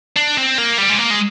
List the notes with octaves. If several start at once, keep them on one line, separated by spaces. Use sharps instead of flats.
D4
C4
A#3
G3
G#3
A#3
G#3